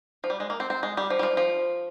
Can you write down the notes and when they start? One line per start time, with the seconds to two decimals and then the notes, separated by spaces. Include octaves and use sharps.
0.24 F3
0.30 G3
0.40 G#3
0.50 A#3
0.60 C4
0.70 C4
0.83 G#3
0.97 G3
1.10 F3
1.19 G3
1.23 F3
1.37 F3